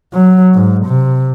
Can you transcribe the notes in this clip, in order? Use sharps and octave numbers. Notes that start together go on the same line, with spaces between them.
F#3
G#2
C3